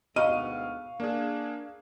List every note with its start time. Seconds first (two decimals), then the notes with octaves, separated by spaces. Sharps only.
0.16 D2 G#2 B2 D#5 F5 C#6 F6 D#7
1.00 A#3 D4 G#4